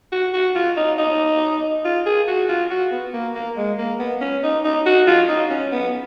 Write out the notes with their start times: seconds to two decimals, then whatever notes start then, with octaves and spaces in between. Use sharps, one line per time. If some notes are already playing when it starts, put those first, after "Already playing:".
0.12 F#4
0.34 F#4
0.55 F4
0.77 D#4
0.98 D#4
1.85 F4
2.06 G#4
2.28 F#4
2.49 F4
2.71 F#4
2.92 B3
3.13 A#3
3.35 A#3
3.57 G#3
3.78 A#3
4.00 B3
4.21 C#4
4.43 D#4
4.64 D#4
4.86 F#4
5.07 F4
5.29 D#4
5.50 C#4
5.72 B3